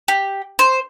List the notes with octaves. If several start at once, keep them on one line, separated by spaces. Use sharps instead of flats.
G4
C5